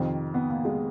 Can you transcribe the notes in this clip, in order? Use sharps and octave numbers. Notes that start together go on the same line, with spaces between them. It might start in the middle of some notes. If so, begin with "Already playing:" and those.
Already playing: F2 C3 D#3 C4
B3
A#3
G#3